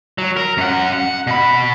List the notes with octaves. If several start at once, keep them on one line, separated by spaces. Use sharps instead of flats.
F#3
A#4
F#2 F#5
F#5
B2 B5